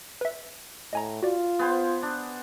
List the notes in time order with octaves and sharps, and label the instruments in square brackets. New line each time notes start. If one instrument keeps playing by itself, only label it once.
[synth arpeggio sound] B4 E5
[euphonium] A2 [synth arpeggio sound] D#5 G#5 A#5
[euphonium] F4 [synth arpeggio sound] F#4 D5
[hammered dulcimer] B3 G#4 C5
D4